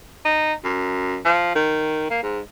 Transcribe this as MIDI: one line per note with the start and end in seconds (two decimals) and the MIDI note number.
0.25 0.54 63
0.64 1.18 42
1.25 1.52 53
1.55 2.09 51
2.10 2.22 58
2.23 2.40 44